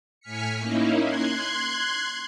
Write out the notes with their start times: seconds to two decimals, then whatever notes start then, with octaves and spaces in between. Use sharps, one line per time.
0.21 A2 G#5 F6 B6 C#7
0.58 A#3 C#4 D#4 E4
0.99 C6 F#6 G#6